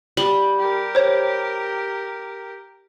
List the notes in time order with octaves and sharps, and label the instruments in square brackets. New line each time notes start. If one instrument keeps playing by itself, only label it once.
[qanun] G3 [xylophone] F#7
[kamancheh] G4 A#4
[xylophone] C5 C#5